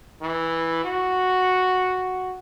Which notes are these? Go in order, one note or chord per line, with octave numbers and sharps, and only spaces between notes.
E3
F#4